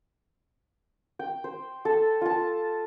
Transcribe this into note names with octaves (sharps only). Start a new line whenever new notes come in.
G5
C5
A4
F4 A5